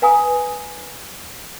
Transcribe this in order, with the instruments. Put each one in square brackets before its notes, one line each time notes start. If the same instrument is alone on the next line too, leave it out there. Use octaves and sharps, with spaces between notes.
[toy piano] B4 F5 G#5 A#5 D#6